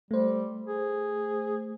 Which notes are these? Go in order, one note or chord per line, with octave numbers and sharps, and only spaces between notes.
G3 A3 C5
G#4